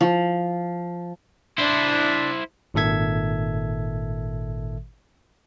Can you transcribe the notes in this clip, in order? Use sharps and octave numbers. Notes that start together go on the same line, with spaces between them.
F3
D4 E4 C5
G#1 A#2 D#3 A4 E5 G#6